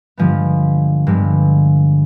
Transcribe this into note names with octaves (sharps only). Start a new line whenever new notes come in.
G2 D3 F3 G#3 B3
G2 D3 F3 G#3 B3